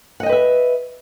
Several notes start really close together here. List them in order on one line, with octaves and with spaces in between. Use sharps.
F#5 D#5 G5 B4 E5